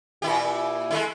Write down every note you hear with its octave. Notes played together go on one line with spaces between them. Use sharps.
A#2 E4 G4
G#3 A3 E4